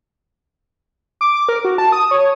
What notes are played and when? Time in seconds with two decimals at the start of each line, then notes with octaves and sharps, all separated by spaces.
1.21 D6
1.35 D6
1.49 A#4
1.65 F#4
1.78 A5
1.92 D#6
2.11 C#5